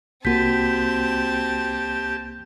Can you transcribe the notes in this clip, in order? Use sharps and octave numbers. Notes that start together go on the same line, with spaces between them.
C2 A#3 C4 F#4 G4 A5 B6